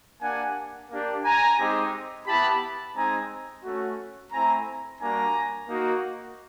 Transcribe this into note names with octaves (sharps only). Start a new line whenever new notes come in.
A#3 D4 G4 F#5 G#5
A#3 D4 G4
G#5 A#5
G#3 C4 D#4 G4
B3 E4 G4 A5 B5
G#3 C4 D#4 G#5 A#5
A3 C#4 F#4
A3 C4 E4 G#5 A#5
G3 A#3 D4 F#4 G#5 A#5
A#3 D#4 F#4